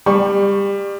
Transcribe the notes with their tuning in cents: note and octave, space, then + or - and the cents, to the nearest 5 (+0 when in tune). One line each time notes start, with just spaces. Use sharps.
G3 +25 C#6 -5